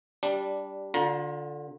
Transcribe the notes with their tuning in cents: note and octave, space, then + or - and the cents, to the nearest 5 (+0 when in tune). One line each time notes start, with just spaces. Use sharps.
G3 +0 D4 -10
D3 +0 F4 +35 A#5 +30